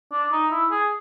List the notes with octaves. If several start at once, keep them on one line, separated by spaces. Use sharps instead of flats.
D4
D#4
E4
G#4